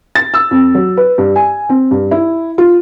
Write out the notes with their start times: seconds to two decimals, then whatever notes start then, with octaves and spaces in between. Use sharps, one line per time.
0.15 A6
0.34 E6
0.51 F2
0.75 F#3
0.97 B4
1.18 G2
1.36 G#5
1.69 C4
1.91 G2
2.11 E4
2.58 F4